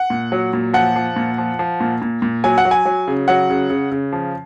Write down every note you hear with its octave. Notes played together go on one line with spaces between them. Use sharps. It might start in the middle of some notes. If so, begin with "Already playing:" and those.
Already playing: F#5
A#2
F#3
A#2
F3 F#5
F3
A#2
F3
F3
A#2
A#2
A#2
F#3 G#5
F#5
F#3
G#5
F#3
C#3
F#3 F#5
C#3
C#3
C#3
F3